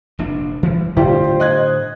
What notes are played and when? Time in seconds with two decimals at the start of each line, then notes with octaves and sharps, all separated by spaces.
0.19 F1 A#1 D4
0.63 E3 G3
0.97 A2 D3 G3 F4 G4 C5
1.40 D#5 F#6 G#6